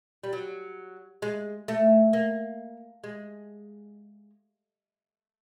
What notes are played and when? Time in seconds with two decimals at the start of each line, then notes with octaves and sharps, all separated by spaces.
0.24 G3
0.33 F#3
1.22 G#3
1.68 A3
2.13 A#3
3.04 G#3